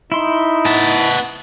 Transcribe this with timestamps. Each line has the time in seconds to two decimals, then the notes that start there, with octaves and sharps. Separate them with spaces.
0.12 D#4 E4 C6
0.65 B3 A5